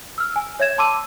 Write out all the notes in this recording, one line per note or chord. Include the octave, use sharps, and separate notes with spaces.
E6 F6
G#5
C#5 E5 G#6 E7
A5 C6 D6 E6 D#7